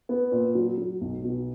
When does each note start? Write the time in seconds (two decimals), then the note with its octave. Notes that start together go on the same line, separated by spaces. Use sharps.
0.09 B3
0.32 A#2
0.55 F#3
0.78 F#3
1.01 B1
1.24 B2